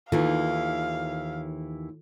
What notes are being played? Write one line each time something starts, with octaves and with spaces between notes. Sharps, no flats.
D#2 D#3 E3 F4 A4 F5